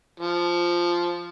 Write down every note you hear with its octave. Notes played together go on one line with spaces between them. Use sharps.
F3